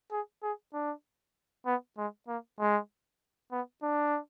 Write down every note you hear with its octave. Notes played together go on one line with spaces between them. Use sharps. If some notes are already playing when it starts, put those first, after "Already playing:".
G#4
G#4
D4
B3
G#3
A#3
G#3
B3
D4